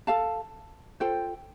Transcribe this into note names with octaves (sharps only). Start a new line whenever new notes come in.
A4 F5 A5
F4 A4 C5 G5